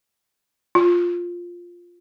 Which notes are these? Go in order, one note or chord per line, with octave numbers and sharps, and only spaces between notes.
F4